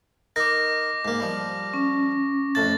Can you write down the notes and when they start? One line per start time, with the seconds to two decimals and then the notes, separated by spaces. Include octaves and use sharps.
0.36 D#4 A#4 D6 A#6
1.05 G#2 A#3
1.20 F3 G3
1.74 C#4
2.55 F2 A2 A5 A6